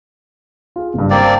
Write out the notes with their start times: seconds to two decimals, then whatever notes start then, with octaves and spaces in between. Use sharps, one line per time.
0.76 F4 G#4
0.94 F#1 G2
1.11 A#3 C4 D5
1.24 A5